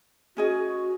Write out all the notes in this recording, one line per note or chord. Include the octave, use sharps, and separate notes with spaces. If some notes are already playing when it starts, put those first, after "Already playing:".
C#4 F#4 G#4 D#5